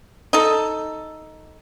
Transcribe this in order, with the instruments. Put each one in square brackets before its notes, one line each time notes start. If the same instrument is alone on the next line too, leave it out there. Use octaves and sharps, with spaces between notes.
[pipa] D#4 A4